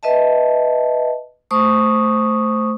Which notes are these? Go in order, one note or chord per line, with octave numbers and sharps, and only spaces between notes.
B4 D#5 E5 A5
A3 C5 C#6 D#6